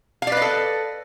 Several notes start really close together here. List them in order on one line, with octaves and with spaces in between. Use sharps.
F5 D5 B4 D#5 A4